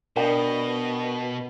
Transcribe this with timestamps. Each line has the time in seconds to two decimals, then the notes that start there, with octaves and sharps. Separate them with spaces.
0.16 B2 D4 A#4 D#5 G5